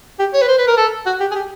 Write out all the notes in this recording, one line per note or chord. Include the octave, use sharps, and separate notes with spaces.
G4
C#5
B4
C5
B4
A#4
A4
F#4
G4
G#4
G4